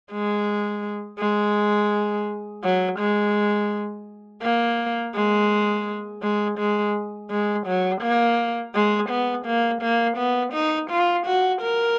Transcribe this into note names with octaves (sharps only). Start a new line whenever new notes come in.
G#3
G#3
F#3
G#3
A#3
G#3
G#3
G#3
G#3
F#3
A#3
G#3
B3
A#3
A#3
B3
D#4
F4
F#4
A#4